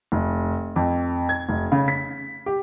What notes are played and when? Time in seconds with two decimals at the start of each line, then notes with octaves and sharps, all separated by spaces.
0.12 F1
0.76 F2
1.29 G#6
1.49 F1
1.72 C#3
1.88 B6
2.46 G4